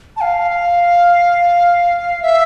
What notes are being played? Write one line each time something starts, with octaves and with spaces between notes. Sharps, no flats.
A5
F5
E5